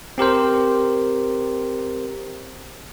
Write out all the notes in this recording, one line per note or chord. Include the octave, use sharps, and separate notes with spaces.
C4 G4 A#4 C5